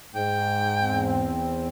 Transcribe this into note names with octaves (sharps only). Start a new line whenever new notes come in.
G#2 G5
E2 C4